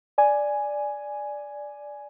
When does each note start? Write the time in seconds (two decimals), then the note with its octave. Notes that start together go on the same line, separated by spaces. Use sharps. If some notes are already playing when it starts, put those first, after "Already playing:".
0.18 D5 G#5